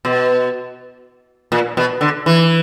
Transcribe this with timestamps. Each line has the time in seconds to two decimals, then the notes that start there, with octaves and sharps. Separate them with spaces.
0.05 B2
1.52 A#2
1.77 B2
2.01 D3
2.26 E3